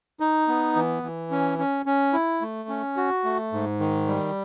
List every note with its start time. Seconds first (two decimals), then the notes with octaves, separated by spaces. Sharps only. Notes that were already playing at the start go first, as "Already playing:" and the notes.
0.20 D#4
0.48 B3
0.76 E3
1.03 E3
1.31 C#4
1.59 C#4
1.86 C#4
2.13 E4
2.41 A3
2.69 C#4
2.97 F#4
3.24 A3
3.52 G#2
3.80 D#3
4.07 G3